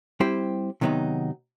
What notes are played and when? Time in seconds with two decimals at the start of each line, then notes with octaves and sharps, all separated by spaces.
0.20 G3 C4 E4 G4 C5
0.81 C3 D#3 F#3 B3 D#4